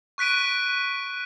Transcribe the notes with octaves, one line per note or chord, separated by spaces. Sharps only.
C#6 F#6 B6 D7 D#7